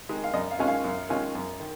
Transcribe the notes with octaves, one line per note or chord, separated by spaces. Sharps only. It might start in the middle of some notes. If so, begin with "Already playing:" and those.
D#3 G#3 D#4
F5
F#2 D#5
F5
D#3 G#3 C#4 F4
F5
F#2
D#3 G#3 C#4 F4
F#2
D#3